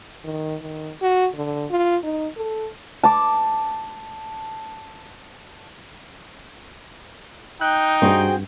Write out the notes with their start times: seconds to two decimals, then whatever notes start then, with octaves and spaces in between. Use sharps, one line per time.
0.24 D#3
0.61 D#3
1.02 F#4
1.35 D3
1.70 F4
2.03 D#4
2.36 A4
3.03 A5 D6
7.61 D#4 G5 F#6
8.02 G2 C4 F#4 G#4